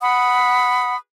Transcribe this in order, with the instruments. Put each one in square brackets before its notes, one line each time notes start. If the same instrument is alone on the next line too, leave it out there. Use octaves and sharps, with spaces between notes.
[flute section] F#5 B5 D#6